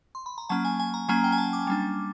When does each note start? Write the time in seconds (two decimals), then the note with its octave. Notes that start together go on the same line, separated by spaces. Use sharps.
0.15 C6
0.26 B5
0.38 A#5
0.49 F#3 A#3 C#4 A5
0.65 G#5
0.80 G#5
0.94 A#5
1.09 F#3 A#3 C#4 G#5
1.24 G5
1.32 G#5
1.38 A5
1.53 D6
1.67 G3 A#3 D4